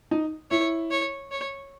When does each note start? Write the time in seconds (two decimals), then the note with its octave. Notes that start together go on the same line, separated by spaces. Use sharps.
0.11 D#4
0.51 E4 C#5
0.91 C#5
1.31 C#5